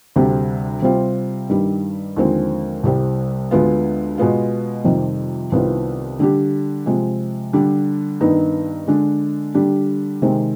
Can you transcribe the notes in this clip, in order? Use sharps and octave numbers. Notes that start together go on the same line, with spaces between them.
D2 C3 G3
C3 G3 C4 F4
G2 D#3 G3
D#2 D3 F3 G#3 C4
C2 C3 G3 C4
D2 D3 G#3 B3 F4
B2 G#3 B3 F4
F2 C3 D#3 G3
C2 C3 D#3 B3 F4
D3 G3 D4 G4
C3 F3 G#3
D3 G3 D4
G2 D#3 B3 D#4
D3 G#3 D4
D3 G3 D4 G4
C3 D#3 G#3 C4